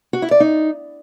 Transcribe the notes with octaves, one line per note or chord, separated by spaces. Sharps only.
F#4
E4
D5
D#4